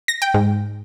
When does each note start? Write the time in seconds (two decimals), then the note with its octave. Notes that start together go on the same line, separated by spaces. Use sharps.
0.08 A#6
0.22 G5
0.34 G#2